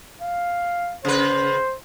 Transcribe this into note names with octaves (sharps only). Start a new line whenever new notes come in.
F5
C#3 B4 C5